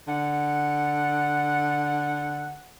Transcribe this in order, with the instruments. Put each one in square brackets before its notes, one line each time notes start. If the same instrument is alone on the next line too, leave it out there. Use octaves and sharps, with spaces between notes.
[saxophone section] D3 F#5